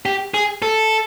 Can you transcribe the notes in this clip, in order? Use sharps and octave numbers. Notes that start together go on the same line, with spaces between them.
G4
G#4
A4